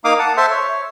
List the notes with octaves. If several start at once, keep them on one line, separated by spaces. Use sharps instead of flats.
A#3 D#4 F5 D6 D#6
F#5 A5
A4 C5 E5 A5 C6
C#5